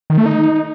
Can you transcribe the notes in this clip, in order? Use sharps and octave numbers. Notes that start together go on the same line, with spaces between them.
D#3
A3
D#4